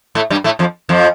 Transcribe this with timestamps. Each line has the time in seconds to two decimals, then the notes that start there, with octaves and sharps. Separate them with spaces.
0.15 A2 A3
0.30 G2 G3
0.44 A2 A3
0.59 F2 F3
0.89 F2 F3